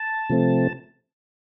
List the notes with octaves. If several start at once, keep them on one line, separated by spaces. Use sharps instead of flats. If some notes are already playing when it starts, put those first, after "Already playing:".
Already playing: A5
C3 F3 A3 C4